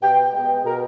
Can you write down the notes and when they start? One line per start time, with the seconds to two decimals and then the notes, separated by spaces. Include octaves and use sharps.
0.02 B2 G5
0.33 G#3 B3 G5
0.64 B2 A#4